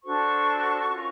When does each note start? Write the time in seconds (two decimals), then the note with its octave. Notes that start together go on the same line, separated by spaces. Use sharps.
0.04 D4 F#4 A4 C5 C#6
0.91 C#4 F4 A#4 C#5